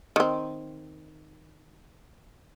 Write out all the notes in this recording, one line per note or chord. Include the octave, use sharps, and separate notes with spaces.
D#3 C4